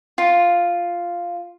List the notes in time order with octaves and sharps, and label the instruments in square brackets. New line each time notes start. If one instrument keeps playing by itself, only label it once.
[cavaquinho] F4